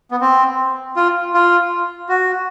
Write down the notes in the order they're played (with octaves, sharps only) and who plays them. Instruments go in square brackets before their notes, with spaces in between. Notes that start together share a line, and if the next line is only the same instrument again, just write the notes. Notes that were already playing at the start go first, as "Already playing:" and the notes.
[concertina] B3
C4
F4
F4
F#4